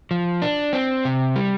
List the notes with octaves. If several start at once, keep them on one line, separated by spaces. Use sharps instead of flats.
F3
D4
C4
C3
G3